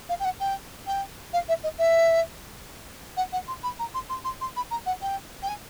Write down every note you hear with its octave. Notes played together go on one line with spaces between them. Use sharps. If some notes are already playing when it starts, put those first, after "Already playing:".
F5
G5
F#5
G5
G5
F5
E5
D#5
E5
F#5
F#5
C6
B5
A#5
C6
C6
C6
C6
B5
A#5
F#5
G5
G5
G#5